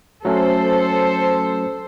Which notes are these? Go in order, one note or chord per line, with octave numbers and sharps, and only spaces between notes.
F#3 A3 C#4 A4 C5